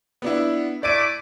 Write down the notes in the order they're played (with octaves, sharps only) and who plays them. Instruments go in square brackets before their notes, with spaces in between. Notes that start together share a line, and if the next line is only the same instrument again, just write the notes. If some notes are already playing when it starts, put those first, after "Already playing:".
[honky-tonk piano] B3 D4 E4
[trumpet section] A3 E4 D6 [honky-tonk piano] D5 D#7